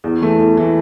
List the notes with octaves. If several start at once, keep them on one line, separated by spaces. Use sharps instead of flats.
E2
E3 A3
E2
E3 A3